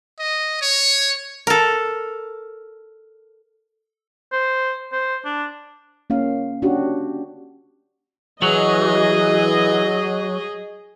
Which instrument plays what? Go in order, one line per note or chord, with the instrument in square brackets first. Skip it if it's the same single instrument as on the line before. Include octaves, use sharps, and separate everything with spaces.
[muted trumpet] D#5
C#5
[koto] A4 A#4
[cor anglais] C5
C5
D4
[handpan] A#3 C#4 F5
C#4 D4 F#4 G4
[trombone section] E3 [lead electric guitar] F#3 [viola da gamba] G#4 [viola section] D#5